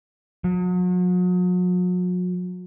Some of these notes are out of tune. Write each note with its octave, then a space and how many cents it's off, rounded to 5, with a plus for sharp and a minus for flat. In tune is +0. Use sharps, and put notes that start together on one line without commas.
F#3 -40